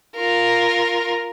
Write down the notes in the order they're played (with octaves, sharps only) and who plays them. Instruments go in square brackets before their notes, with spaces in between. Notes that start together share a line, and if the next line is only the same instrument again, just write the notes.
[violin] F4 A#4